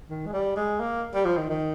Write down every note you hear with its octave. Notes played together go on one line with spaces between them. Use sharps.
D#3
G#3
G3
G#3
A#3
G3
F3
D#3
D#3